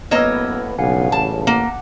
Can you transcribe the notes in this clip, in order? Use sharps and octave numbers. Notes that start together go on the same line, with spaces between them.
F#2 A2 A#3 B3 C#5 D#5 E6 F6
F#1 B1 G2 C#3 F5 F#5 G#5
A1 A5
A#3 F#5